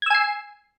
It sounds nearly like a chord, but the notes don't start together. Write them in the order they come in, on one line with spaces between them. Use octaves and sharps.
G#6 E6 G#5 C7